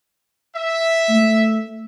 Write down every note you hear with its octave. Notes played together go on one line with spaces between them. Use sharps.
E5
A3